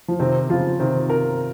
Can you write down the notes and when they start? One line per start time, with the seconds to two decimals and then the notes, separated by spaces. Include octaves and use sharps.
0.08 F3
0.20 C3 D#3 C4
0.49 C#3 F3 F4
0.80 C3 D#3 C4
1.10 A#4